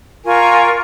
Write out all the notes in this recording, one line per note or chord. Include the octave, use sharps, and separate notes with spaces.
F4 A#4 G#5 C#6